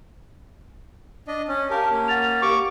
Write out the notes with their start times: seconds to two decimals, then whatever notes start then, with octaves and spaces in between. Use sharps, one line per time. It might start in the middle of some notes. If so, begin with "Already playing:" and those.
1.28 D4 D#5
1.48 C#4
1.70 G4 A#4 F5 A5
1.91 A#3 C#4
2.08 F#5 A6 F7
2.42 G4 A#4 F5 C#6 D6